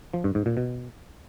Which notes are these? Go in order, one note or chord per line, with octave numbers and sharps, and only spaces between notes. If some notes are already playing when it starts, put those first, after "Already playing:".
F3
G2
G#2
A#2
B2